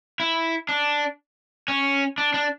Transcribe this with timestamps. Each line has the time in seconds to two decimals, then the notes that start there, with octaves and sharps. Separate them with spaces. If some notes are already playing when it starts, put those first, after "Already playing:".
0.20 E4
0.69 D4
1.68 C#4
2.18 D4
2.34 D4